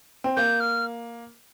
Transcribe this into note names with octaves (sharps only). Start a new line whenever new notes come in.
C4
A#3 G6
F6